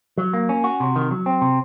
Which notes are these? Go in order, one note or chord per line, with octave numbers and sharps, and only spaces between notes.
F#3
A#3
C#4
F#4
C3
D#3
F#3
C4
C3